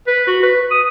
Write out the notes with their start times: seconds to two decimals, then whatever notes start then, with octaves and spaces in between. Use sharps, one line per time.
0.07 B4
0.27 F#4
0.43 B4
0.71 D#6